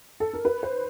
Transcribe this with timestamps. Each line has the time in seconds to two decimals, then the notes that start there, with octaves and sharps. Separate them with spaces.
0.20 A4
0.33 A#4
0.45 B4
0.63 C5